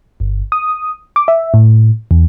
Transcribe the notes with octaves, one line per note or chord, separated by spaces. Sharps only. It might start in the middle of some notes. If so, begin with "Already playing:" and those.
G1
D#6
D6
E5
A2
E2